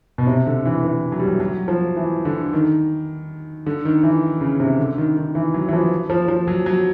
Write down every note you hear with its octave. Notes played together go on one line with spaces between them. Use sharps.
B2
C3
D3
E3
E3
F#3
G3
F#3
F#3
F3
E3
D3
D#3
D3
D#3
E3
C#3
C3
D3
D#3
D#3
E3
F#3
E3
F3
F3
F3
F#3
F#3